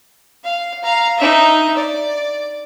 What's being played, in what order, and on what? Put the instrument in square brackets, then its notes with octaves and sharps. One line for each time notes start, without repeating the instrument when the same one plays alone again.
[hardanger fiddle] F5
F5 A#5
D#4 E5
D5